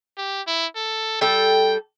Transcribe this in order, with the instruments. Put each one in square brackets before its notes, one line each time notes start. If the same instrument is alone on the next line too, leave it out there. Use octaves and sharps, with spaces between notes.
[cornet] G4
E4
A4
[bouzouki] G3 A4 [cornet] G5